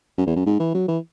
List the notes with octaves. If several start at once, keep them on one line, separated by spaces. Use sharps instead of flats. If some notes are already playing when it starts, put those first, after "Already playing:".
F#2
E2
F#2
G#2
E3
F#3
E3